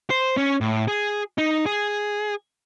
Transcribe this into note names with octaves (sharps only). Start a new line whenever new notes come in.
C5
C#4
A2
G#4
D#4
G#4